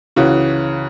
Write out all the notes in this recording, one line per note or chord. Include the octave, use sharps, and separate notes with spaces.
C#2 C#3 E3 F#4